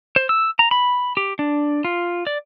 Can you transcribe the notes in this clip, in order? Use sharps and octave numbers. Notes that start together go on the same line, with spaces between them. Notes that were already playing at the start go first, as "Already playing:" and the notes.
C5
E6
A#5
B5
G4
D4
F4
D5